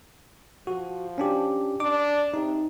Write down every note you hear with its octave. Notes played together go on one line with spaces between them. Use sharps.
F3 F#4
C#4 D4 G4
D4 D6
C3 D#4